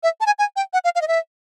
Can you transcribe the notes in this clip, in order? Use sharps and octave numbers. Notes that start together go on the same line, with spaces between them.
E5
A5
G#5
G#5
G5
F#5
F5
F5
D#5
E5